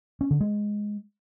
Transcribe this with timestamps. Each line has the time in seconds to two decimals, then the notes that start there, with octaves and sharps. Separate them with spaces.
0.21 C#4
0.31 D3
0.40 G#3